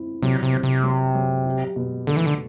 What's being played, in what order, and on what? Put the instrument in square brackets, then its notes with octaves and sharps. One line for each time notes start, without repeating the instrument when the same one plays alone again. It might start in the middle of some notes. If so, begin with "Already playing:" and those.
Already playing: [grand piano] C4 E4
[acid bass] C3 [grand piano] F#3
[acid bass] C3
[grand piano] C4
[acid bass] C3
[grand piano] F#3
F#3
G4
B2
[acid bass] D3 [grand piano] A3
[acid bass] E3
D3